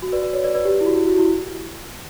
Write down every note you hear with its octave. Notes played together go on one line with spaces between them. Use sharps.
F#4
B4 D5
B4 D5
C#5
B4 D5
B4 D5
G4
E4
F#4
E4
F#4
E4